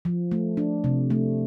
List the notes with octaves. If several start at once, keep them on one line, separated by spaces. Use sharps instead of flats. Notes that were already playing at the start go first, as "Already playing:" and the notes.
F3
A3
D4
C3
A3